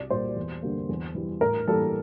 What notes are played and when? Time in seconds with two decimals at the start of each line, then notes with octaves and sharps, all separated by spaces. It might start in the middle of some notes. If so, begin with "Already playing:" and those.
Already playing: C2 D5
0.10 A#2 G3 C5
0.36 E2
0.62 D3 G3 A#3
0.89 E2
1.15 E3 G3
1.41 A2 A#4
1.68 E3 G3 A#3 A4